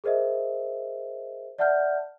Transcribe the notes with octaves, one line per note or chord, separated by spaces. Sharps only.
G#4 A#4 C5 D#5 E5
D5 E5 F#5 A5 F6 G6